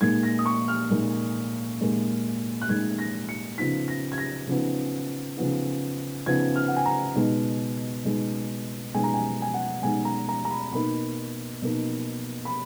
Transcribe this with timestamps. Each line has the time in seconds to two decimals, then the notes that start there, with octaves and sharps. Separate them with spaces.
0.01 A#2 G#3 D#4 G#6
0.23 A#6
0.39 D#6
0.46 C#6
0.68 F6
0.90 A#2 G#3 D#4
1.80 A#2 G#3 D#4
2.61 F#6
2.69 A#2 G#3 D#4 G#6
2.99 A#6
3.29 C#7
3.58 C#3 F3 B3 D#4 B6
3.88 A#6
4.12 G#6
4.18 A#6
4.47 C#3 F3 B3 D#4
5.37 C#3 F3 B3 D#4
6.26 C#3 F3 B3 D#4 G#6
6.56 F6
6.68 F#5
6.76 G#5
6.85 A#5
7.15 B2 G#3 D#4
8.05 B2 G#3 D#4
8.94 B2 G#3 D#4 G#5
9.03 A#5
9.14 G#5
9.42 G#5
9.54 F#5
9.83 B2 G#3 D#4 G#5
10.05 A#5
10.29 A#5
10.45 A#5
10.51 B5
10.73 B2 A#3 D#4 B5
11.62 B2 A#3 D#4
12.45 B5